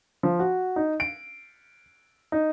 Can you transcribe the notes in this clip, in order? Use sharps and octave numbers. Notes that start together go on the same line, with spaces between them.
F3
F#4
D#4
D7
D#4